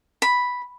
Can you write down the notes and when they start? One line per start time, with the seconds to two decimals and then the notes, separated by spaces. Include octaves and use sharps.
0.22 B5